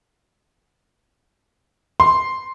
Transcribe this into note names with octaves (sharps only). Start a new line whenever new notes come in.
C6